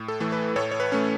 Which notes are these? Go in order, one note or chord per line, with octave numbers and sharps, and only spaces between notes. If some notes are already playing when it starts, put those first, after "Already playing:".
Already playing: A2
A4
E3 A3
B4
A2 A4 C#5
C#5
B4
A3 C#4